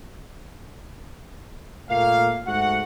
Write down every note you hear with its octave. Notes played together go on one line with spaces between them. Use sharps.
A#2 A3 A#3 F5
G#2 A3 F#4 F#5